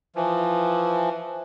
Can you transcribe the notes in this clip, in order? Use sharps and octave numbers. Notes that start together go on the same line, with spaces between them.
E3 F3